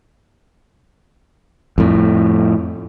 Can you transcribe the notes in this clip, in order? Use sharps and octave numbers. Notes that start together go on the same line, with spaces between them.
F2 A2